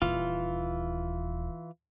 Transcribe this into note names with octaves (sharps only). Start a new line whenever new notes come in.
D#1 E3 F4